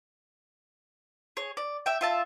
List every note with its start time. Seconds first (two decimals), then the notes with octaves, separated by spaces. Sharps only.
1.37 G#4 C#5
1.57 D5
1.86 E5 G5
2.01 F4 E5 A5